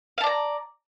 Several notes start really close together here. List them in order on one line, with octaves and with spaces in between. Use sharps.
F5 A5 D5 A#5